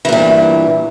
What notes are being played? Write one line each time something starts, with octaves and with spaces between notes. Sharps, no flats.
G2 A#2 E3